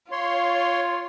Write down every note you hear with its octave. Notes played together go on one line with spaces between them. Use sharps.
F4 C#5 C6